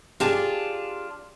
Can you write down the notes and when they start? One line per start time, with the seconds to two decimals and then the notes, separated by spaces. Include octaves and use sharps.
0.20 D4 F4 G4 G#4